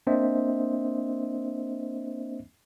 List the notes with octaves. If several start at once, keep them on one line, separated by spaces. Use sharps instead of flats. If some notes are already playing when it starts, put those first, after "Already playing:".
A#3 C4 D4 C5 D#5 E5